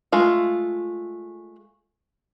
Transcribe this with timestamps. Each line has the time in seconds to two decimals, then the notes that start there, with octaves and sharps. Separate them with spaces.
0.12 G#3 A3 F4